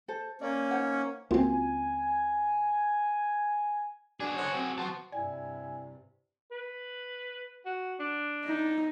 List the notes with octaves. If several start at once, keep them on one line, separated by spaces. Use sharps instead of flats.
A4 C5
A#3 C#4 D5
D#4 C5 F#5
C#2 A#3 C4 F4 F#4 G#5
B2 D4 F#4 G#4
D3 C5 C#5
F#3 C4
B3 C4 F#4 C5 A5
G2 C3 E4 D5 G#5
B4
F#4
D4
D#4